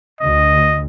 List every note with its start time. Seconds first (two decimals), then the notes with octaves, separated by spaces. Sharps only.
0.20 D2 D#5